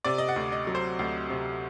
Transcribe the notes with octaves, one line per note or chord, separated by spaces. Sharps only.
C3 D5
D#5
F#5
D2
D#5
F#3
C5
D2
C3